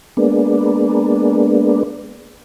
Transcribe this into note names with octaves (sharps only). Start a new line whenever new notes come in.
G#3 A#3 B3 D4